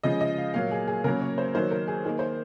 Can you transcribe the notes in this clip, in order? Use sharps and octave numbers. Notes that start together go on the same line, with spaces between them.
C#3 F3 G#3 D#5
D#5
F5
A#2 F#3 A#3 F5
G#4
G#4
C#3 F#3 A#3 A#4
C#5
C5
D#3 F#3 A#3 C5
A#4
G#4
D#3 A#3 G#4
C5